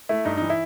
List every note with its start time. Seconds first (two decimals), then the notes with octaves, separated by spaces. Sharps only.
0.09 A3 E4
0.25 G2 D#4
0.37 E3 D#4
0.50 E4